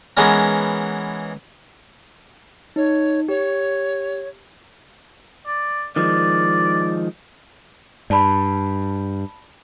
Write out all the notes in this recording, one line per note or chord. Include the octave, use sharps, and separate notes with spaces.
E3 G#3 B3 C#4 A#4
D#4 C#5
G4 C#5
D5
D#3 F3 G#3 D5
G2 D5 A5 B5